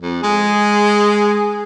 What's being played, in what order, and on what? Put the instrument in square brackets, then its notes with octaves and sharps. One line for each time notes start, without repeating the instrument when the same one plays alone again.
[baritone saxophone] F2
[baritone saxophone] G#3 [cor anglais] G#4